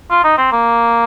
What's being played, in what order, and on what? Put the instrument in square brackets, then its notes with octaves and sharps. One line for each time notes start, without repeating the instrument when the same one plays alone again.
[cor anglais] F4
D#4
C4
A#3